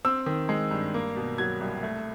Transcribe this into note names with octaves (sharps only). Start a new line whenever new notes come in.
C4 E6
D#3
G#3
G2
A#3
B2
F#3 G#6
C2
A3